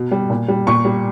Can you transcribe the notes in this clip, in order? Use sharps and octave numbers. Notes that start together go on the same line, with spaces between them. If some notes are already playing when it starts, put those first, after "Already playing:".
Already playing: B2
G3
A#2
G3
A#2 C#6
G3